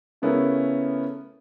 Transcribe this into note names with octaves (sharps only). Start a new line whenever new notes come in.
C#3 A3 B3 C#4 E4 A#4